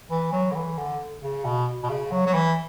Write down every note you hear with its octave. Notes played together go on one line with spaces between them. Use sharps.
E3
F#3
D3
E3
D3
C#3
B2
B2
C#3
F#3
F#3
E3